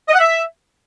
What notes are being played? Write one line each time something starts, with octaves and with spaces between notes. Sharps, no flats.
D#5
F#5
E5